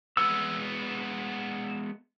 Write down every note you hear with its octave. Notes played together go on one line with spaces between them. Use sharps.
G#3 B3 E6